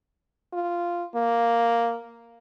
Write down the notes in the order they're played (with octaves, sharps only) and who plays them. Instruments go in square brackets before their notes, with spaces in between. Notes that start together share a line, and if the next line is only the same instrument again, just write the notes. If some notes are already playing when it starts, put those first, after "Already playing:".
[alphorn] F4
A#3